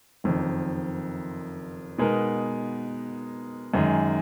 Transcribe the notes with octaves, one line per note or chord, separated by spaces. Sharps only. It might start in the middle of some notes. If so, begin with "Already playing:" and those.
F#1 F2 D#3
B2 G#3 B3 D#4 A#4
F#2 D#3 G#3